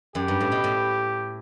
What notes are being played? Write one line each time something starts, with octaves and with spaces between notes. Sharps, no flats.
F#2 G4
G2
A2
B2
A2